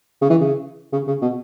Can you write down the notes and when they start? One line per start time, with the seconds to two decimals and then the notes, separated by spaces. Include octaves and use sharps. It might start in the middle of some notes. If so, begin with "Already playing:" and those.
0.22 C#3
0.30 E3
0.41 C#3
0.92 C#3
1.07 C#3
1.22 B2